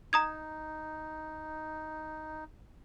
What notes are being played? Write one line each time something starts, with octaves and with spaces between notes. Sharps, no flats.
D#4 A#5 D#6 G#6